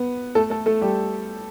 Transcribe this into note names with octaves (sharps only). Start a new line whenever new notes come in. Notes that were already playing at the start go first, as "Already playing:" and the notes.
Already playing: B3 B4
A3 A4
A3 A4
A3 A4
G3 G4